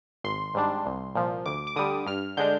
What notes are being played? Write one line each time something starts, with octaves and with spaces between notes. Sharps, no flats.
G#1 C6
G#2 G3 D4
C2
A#2 F3
D2 D6
D6
D3 G3 D#6
G2 F6
D3 G#3 D4 G6